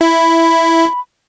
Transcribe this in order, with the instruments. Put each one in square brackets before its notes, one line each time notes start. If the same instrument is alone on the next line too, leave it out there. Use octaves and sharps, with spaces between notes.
[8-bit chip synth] E4 [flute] B5